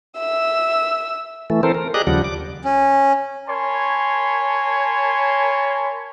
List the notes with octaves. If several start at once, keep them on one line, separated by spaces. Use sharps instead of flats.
E5 E6
E3 A3
E3 C4 A4 A#4 C5
A#4
G4 G#4 D5 D#5 A#5 F#6
D#2 C#3 F3 G3 D5 F#5
D6
C#4
A#4 C#5 G#5 A5 B5 C6